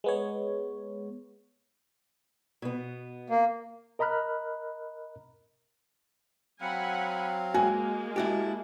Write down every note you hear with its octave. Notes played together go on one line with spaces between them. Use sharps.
G#3 B3 C#5
B2 B3
A#3
A#4 D#5 A#5 B5 F6 F#6
F#3 C4 F5 F#5 G#5 B5
G#3 A#3 F#4 G#5
E4 F#4 G4 A5